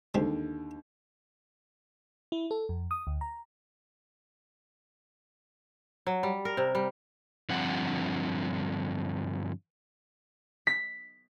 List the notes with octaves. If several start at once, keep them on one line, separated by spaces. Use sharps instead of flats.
D#2 D3 G3 G#3 C4
E4
A4
F2
D#6
D2
A#5
F#3
G3
A#4
C3
G3
G2 D3 F3 C4 F#5
B6